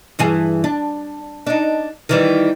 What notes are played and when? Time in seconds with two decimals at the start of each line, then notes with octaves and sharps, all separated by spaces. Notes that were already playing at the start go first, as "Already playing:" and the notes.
0.19 G2 E3 G#4
0.64 D4
1.47 D4 D#4
2.09 D#3 E3 G3